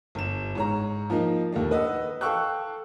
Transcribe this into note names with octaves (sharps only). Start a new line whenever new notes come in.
G1 E7
G#2 C#5 A#5
F3 A#3 D#4
D#2 A3 A#3 D4
B4 D#5 F#5 E6
A4 F5 G5 C#6 E6 F#6